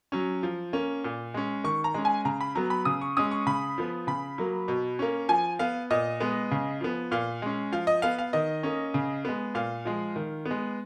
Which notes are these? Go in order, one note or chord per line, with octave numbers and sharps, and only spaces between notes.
F#3 C#4
F3
A#3 C#4
A#2
G#3 C#4
D#3 C#6
A#5
G#3 C#4
G#5
C#3 A#5
B5
F#3 B3 A#5
B5
C#3 D#6
C#6
G#3 C#4 D#6
C#6
C#3 B5
F3 B3
C#3 B5
F#3 A#3
B2
A#3 C#4
F3 G#5
B3 F5
A#2 D#5
G#3 B3
C#3
F3 B3
A#2 F5
G#3 C#4
F3 F5
D#5
B3 F5
F5
D#3 D#5
A#3 C#4
C#3
G#3 B3
A#2 F5
F3 G#3
D#3
B3
G#3